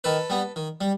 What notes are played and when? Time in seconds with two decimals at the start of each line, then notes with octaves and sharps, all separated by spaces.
0.04 D#3 A4 B4
0.30 G3 B3
0.56 D#3
0.81 G3